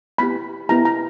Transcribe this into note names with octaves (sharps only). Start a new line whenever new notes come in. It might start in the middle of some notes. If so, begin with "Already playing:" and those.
B3 E4 G4 B5
B3 E4 G4 A#5
A#5